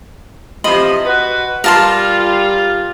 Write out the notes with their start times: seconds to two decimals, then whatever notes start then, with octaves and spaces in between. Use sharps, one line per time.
0.64 C3 E3 F3 D#5 B5 C6
1.05 F#4 B4
1.64 G3 F4 A#4 A5 C6